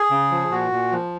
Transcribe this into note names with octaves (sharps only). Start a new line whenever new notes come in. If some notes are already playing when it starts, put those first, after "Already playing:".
Already playing: G#4
C#3
F3
A#2 F#4
A#2
F3